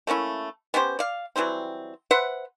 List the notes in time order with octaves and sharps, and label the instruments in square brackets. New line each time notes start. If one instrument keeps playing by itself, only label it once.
[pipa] A3 A#3 C#4 E4
B3 C#4 G4 C5
D5 F5
E3 F#3 G3 C4
B4 C5 E5 F#5